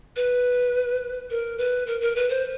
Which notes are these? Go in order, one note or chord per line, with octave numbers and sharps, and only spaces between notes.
B4
A#4
B4
A#4
A#4
B4
C5